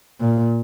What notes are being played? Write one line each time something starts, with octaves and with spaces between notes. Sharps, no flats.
A#2